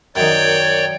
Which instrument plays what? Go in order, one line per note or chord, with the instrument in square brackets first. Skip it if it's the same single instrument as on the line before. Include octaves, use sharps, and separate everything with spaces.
[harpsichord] F#2 D#3 [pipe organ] C#5 D5 [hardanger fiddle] G5